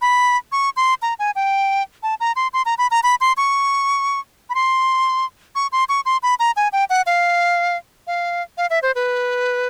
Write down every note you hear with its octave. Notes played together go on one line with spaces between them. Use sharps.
B5
C#6
C6
A#5
G#5
G5
A5
A#5
C6
C6
A#5
B5
A#5
B5
C6
C#6
B5
C6
C#6
C6
C#6
C6
B5
A#5
G#5
G5
F#5
F5
F5
F5
E5
C5
B4